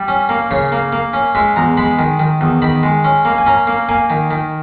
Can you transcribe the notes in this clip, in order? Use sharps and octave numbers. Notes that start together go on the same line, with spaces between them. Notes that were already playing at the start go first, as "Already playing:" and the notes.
Already playing: G3
C#4
A#3
C#3 C#5
A#3
A#3
C#4
G#3 E5
E2 A#5
G#3 B5
D#3
D#3
E2
D#3 B5
G#3
C#4
A#3
G#5
C#4 A#5
A#3
A#3 G#5
D#3
D#3